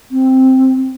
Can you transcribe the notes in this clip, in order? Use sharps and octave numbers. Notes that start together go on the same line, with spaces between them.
C4